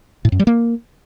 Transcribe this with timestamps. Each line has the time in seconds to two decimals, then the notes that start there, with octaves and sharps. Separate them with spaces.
0.25 A2
0.32 F#2
0.39 G3
0.47 A#3